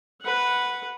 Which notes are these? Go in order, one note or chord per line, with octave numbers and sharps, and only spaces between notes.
B4 F#5